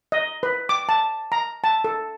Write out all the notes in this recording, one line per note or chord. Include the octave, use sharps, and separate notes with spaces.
D#5
B4
D6
A5
A#5
A5
A4